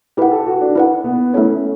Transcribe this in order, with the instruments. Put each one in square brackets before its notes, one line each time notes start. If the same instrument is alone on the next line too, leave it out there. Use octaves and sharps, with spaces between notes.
[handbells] E4 B4 F#5 [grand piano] G4
[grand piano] A4
F#4
D4
[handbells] E4 B4 F#5
[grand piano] B3
[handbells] A3 E4 A4 C#5 [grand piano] C#4